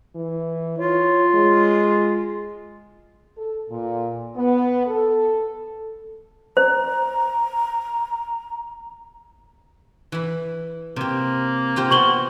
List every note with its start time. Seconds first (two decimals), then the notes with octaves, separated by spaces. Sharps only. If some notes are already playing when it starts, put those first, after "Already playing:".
0.15 E3
0.79 F4 C#5
1.35 G#3
3.38 A4
3.70 A#2
4.36 B3
4.87 A4
6.57 C5 A#5
10.12 E3 B5
10.96 C3 A#3 G4
11.76 F4 G4 C5
11.91 C3 B3 F#4 C#6 F#7 G7